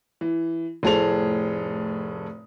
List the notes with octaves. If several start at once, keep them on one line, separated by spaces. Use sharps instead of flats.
E3
F1 A2 G#4 A4 C5 F7